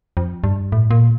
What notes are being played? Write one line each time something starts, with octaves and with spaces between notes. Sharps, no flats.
F2
G2
A2
A#2